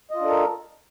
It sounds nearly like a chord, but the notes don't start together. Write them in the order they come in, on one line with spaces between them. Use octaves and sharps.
D#5 F4 D4 A4 A#4